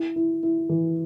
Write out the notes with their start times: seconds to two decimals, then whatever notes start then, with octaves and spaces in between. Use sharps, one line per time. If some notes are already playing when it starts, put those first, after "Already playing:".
Already playing: E4
0.16 E4
0.43 E4
0.69 E3